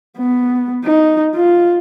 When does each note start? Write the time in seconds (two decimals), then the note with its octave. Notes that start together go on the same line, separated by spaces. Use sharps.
0.18 B3
0.85 D#4
1.35 F4